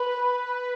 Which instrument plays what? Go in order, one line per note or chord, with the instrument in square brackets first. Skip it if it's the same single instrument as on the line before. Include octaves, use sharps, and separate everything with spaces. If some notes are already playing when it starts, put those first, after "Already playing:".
Already playing: [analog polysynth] B4 [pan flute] B5